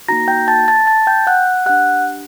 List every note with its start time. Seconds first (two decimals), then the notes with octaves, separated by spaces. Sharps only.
0.08 A#3 D#4 F#4 A#5 A#6
0.28 G5 G6
0.48 A5 A6
0.68 A5 A6
0.87 A5 A6
1.07 G5 G6
1.27 F#5 F#6
1.66 D4 G4 F#5 F#6